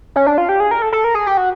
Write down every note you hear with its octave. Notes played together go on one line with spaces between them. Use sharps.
C#4
D4
F4
G4
G#4
A#4
A4
A4
A#4
G#4
G4
F#4